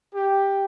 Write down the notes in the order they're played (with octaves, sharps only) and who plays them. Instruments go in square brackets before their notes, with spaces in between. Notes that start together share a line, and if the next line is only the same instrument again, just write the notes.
[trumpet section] G4